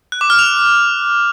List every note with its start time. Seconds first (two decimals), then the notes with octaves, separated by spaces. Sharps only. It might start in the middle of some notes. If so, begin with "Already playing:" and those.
0.12 F#6
0.21 D6
0.30 F6
0.39 F7